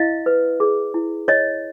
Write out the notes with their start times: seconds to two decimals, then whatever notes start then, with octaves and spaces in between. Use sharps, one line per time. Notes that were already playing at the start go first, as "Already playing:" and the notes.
Already playing: E4 D#5 F5
0.26 B4
0.60 G#4
0.94 E4
1.28 C#5 D#5